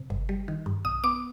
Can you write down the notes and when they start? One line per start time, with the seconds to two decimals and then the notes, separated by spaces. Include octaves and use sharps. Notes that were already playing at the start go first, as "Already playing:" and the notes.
Already playing: C3
0.10 G1
0.29 G3
0.48 D#3
0.66 G2
0.85 B1 D#6
1.04 B3 D6